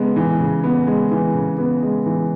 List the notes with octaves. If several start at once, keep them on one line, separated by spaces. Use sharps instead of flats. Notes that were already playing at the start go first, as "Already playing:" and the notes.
Already playing: C#3 G#3 B3
E3
C#3
B3
G#3
E3
C#3
B3
G#3
E3